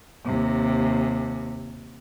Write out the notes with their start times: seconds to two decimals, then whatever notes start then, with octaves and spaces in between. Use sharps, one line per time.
0.25 D#2 C3